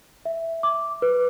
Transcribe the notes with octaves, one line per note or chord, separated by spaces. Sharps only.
E5
D6
B4